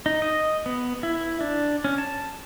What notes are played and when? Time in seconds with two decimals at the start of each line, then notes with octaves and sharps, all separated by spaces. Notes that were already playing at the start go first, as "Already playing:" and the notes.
0.06 D#4
0.22 D#5
0.66 B3
1.03 E4
1.41 D4
1.84 C#4
1.98 A5